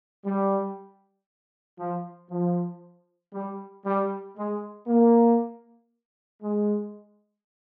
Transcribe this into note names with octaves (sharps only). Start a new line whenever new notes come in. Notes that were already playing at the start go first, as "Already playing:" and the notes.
G3
F3
F3
G3
G3
G#3
A#3
G#3